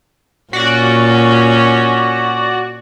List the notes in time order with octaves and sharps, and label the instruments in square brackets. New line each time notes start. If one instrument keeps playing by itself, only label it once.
[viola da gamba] A#2 C#4 [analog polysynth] F#4 D5